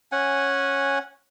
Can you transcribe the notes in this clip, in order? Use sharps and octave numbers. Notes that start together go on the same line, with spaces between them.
C#4 F#5 G#5